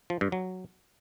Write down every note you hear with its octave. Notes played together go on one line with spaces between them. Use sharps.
F3
G2
F#3